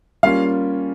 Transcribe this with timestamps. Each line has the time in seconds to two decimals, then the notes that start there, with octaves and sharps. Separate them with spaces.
0.23 G3 A#3 C#4 F4 F5